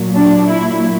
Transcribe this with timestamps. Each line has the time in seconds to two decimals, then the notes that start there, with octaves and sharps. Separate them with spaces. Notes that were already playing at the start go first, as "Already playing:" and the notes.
Already playing: A#2 F#3
0.15 D4
0.47 E4